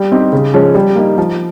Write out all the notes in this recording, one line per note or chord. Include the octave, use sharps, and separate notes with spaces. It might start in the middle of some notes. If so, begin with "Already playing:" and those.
Already playing: G3
C4 D#4 G4
C#3
F3 G#3 C#4
G3
A#3 D#4
F3